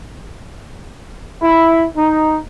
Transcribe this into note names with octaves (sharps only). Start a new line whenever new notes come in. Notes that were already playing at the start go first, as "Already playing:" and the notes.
E4
D#4